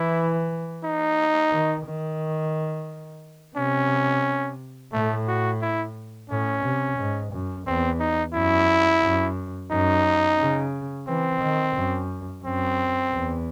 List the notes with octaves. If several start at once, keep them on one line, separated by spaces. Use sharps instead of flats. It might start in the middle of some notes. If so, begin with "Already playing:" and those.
Already playing: E3 E4
D#4
D#3
D#3
C3 C#4
A2 A3
F#4
E4
A2 C#4
C3
G#2
F#2
E2 C4
D#4
F#2 E4
F#2
F#2 D#4
C#3
E3 C4
D#3
F#2
F#2 C4
E2